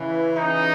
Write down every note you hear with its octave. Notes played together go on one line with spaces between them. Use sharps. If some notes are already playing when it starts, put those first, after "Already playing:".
Already playing: C#3 E3
D#4